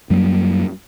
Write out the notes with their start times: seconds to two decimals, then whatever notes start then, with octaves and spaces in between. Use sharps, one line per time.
0.10 F#2 F#3 G3 A#3